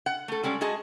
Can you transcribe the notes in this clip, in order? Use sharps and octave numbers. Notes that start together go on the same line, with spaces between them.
F#5
A3 A4
G3 G#3 C#4 A4 D5
G#3 F#4 G#4 D#5 A5